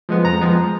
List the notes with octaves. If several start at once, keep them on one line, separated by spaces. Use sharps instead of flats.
F3 G#3 B3
F2 A#5
F3 G#3 B3